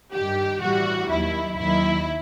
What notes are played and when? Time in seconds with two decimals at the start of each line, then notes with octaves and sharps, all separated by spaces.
0.12 G2 D#3 G3 G4
0.60 A2 E3 G3 F#4
1.09 D#2 D#3 F#3 E4
1.58 D#2 D#3 F#3 E4